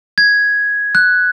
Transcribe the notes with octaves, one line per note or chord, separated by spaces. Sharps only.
G#6
F#6